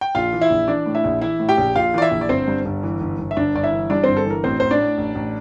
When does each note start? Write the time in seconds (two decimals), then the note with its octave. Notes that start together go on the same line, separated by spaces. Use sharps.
0.01 G5
0.15 A#1 F4 F5
0.33 E3
0.41 E4 E5
0.50 A#1
0.68 E3 D4 D5
0.86 A2
0.95 E4 E5
1.04 A#1
1.22 E3 E4 E5
1.40 A2
1.49 G4 G5
1.57 A#1
1.75 A#1 F4 F5
1.94 E3 D5
2.02 E4 E5
2.11 A#1
2.21 D5
2.29 G1 C4 C5
2.48 G2
2.65 G1
2.83 E3
3.01 G1
3.19 G1
3.31 E5
3.37 G1 D4 D5
3.55 G1 D5
3.64 E4 E5
3.72 E3
3.90 G2 D4 D5
4.03 G1 C4 C5
4.17 A4
4.25 E3 A#4
4.44 A1 C4 C5
4.60 A1 C5
4.71 D4 D5
4.79 A2
4.98 A1
5.15 A1